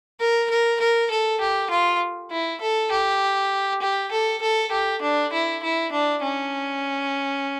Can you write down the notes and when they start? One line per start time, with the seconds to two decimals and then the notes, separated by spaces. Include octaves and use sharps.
0.20 A#4
0.50 A#4
0.80 A#4
1.11 A4
1.40 G4
1.70 F4
2.31 E4
2.61 A4
2.92 G4
3.82 G4
4.12 A4
4.42 A4
4.72 G4
5.02 D4
5.33 E4
5.63 E4
5.92 D4
6.23 C#4